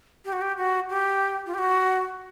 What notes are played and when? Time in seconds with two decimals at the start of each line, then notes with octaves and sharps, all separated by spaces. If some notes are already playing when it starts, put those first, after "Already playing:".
0.25 G4
0.33 F#4
0.41 G4
0.57 F#4
0.90 G4
1.46 F4
1.54 G4
1.58 F#4